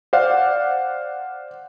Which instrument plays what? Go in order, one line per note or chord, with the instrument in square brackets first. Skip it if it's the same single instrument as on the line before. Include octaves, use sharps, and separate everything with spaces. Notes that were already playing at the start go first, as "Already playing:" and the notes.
[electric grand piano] C5 D5 F5 F#5